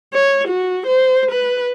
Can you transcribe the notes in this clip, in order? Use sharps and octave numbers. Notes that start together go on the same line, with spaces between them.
C#5
F#4
C5
B4